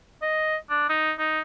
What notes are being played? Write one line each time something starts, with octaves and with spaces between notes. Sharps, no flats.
D#5
D4
D#4
D#4